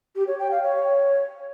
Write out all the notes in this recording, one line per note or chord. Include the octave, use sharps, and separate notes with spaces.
G4
C#5
G5
F5
C#5